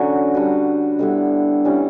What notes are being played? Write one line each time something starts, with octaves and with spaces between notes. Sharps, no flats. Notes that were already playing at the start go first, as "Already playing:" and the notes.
Already playing: D3 F#3 C#4 F#4
G3 D4 F#4 B4
D3 G3 B3 E4
E3 G3 C#4